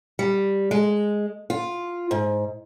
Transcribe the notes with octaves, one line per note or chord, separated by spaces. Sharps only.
G3
G#3
F4
G#2